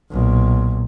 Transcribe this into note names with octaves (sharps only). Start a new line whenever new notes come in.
B1 A#2